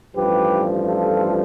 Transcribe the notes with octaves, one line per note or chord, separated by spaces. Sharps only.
A1 G2 F3 G4 B4
F4 A4